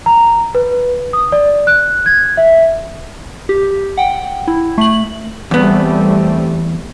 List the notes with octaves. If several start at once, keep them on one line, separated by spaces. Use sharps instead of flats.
A#5
B4
D#6
D5
F#6
G#6
E5
G4
F#5 G5
E4
A3 F#7
E2 G3 A3 B3 C4